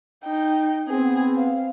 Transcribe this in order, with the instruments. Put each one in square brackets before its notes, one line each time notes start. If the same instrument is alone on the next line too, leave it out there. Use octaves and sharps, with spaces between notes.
[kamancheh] D#4 G5
[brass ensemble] B3 C4 [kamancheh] G#4
[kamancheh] F5